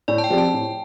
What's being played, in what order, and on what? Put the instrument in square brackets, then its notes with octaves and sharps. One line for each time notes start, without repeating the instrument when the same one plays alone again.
[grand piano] A2 [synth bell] D5
[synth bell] A5
G5
[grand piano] F3 C4 G4 D5
[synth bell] A5
[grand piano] A2